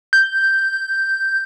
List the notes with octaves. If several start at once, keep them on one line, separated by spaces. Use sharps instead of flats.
G6